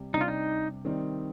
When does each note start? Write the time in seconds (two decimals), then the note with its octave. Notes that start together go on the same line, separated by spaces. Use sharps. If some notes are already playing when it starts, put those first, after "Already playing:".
Already playing: C3 G3
0.14 C3 G3 D4 D#4
0.21 F4
0.28 D#4
0.85 D#3 G3 C4 D#4